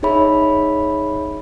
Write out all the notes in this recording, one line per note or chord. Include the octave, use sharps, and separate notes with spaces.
D#4 G#4 C#5 E5 B5